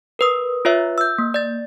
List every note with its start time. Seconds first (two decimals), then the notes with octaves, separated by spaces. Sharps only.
0.19 A#4 B4 D#6
0.65 F4 B4 C#5 E5
0.98 E6 G6
1.18 A#3
1.34 D5 A6